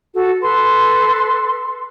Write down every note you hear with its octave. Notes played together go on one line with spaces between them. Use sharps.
F#4 A4
A4 B4 C6